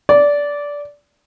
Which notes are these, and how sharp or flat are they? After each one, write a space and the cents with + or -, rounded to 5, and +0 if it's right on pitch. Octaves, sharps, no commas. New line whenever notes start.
D5 -15